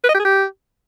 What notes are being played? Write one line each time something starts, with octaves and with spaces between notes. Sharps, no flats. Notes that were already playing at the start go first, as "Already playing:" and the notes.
B4
D#5
G4
G#4
G4